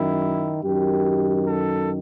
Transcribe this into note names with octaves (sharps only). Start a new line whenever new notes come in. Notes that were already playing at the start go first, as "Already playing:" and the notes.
Already playing: F#2 D#3 E4
F#2 D#3 G4
A4